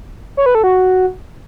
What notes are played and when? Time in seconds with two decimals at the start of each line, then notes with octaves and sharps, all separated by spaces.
0.37 C#5
0.46 B4
0.55 A4
0.64 F#4